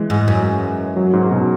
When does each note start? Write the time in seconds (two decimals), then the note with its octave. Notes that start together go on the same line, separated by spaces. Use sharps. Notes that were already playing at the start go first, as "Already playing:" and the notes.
Already playing: E3 G#3
0.10 G#2
0.28 F#2
0.97 F#3
1.13 G#2
1.31 B2